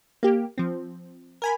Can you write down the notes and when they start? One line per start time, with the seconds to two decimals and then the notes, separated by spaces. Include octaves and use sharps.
0.23 A#3 G4
0.58 F3 C4
1.42 A#4 G#5 B5